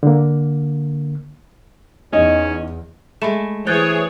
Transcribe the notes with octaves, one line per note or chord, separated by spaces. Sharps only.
D3 A#3
E2 C#4 D#4 D#5
G#3 A3 B5 E7
E3 G#4 C5 C#5 G5 F#6 A6